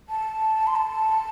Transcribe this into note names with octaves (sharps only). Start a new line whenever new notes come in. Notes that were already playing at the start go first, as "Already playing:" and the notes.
A5
C6
A5